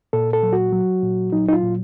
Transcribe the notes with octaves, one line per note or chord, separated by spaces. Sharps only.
A#2 A4
A4
F#3
F#4
F#3
A#2
F#3 D#4
D#4
F4
A#2